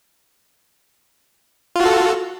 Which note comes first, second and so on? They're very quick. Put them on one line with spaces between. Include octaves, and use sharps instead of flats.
F4 F#4 A4